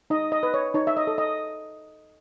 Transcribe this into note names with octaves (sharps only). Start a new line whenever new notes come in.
D#4 D#5
D#5
B4
C#5
D#4 C#5
E5
D#5
A4
D#5